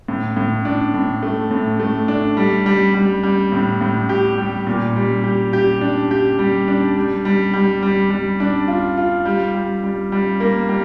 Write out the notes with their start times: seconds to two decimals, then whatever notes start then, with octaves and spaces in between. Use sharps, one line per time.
0.08 A2
0.37 A2
0.65 D4
0.94 A2
1.22 A3
1.51 A2
1.80 A3
2.08 D4
2.37 G3
2.66 G3
2.94 G3
3.23 G3
3.52 A2
3.81 A2
4.09 G4
4.38 G3
4.67 A#2
4.96 G3
5.24 G4
5.53 G4
5.81 D4
6.11 G4
6.39 G3
6.68 D4
6.97 G3
7.25 G3
7.53 G3
7.83 G3
8.11 G3
8.40 D4
8.68 F4
8.97 F4
9.25 G3
9.54 G3
9.84 G3
10.12 G3
10.40 A#3
10.69 G3